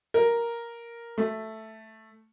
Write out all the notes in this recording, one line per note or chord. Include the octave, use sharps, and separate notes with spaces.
A#4
A3